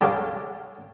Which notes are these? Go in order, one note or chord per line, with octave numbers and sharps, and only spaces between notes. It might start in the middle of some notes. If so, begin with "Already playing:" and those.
G3 G4 A4 C#5 F5